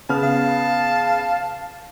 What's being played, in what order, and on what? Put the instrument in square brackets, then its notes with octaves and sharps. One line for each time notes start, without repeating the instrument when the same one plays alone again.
[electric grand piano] C#3 B3 F6 [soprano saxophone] A5
[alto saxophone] F5